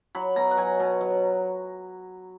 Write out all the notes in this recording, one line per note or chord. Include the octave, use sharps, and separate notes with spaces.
F#3 B5
B2 A#5
F#5
F#3 G#5
B2
F#3